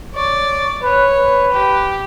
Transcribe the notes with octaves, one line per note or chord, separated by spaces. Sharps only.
C#5 D5
B4 C#5
B4
G4